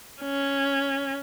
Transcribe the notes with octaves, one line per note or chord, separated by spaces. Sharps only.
C#4